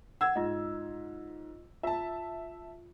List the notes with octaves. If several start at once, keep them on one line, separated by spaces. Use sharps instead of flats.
F#5 E6 G#6
G#2 F4 D#5
F4 E5 A5